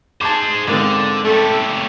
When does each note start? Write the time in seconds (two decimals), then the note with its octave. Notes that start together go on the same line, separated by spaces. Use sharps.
0.21 G#4 C5 A5 D6
0.68 G#2 D3 A#3 C4
1.25 A3 G4 A4